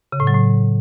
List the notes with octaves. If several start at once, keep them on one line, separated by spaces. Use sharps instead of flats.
C#3
A2
F#3
A2